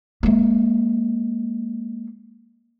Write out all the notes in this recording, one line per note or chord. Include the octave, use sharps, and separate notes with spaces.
G#3 A#3